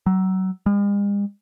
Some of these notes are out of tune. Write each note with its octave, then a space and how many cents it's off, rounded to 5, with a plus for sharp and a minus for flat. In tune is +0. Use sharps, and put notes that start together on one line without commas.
F#3 +25
G#3 -45